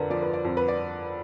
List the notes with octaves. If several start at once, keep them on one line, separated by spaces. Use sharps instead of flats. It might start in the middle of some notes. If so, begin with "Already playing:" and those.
Already playing: F2 D3 D4 A#4 B4
F3 D5
B4
D5
F2
B4
D5